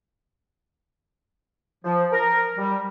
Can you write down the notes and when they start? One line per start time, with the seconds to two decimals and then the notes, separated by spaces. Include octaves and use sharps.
1.84 F3
2.13 A#4
2.57 G3